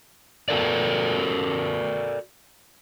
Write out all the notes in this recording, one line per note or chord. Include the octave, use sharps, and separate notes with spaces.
F#4 A4 A#4 D5